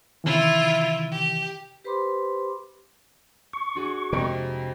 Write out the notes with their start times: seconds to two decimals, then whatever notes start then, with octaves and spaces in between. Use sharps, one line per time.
0.24 C3 D#3 E3 E4 F4 E5
1.10 G4
1.84 G4 B4 C5 B5 C6 D6
3.53 C#6
3.75 D4 F#4 G#4
4.13 F2 C3 G#3 D7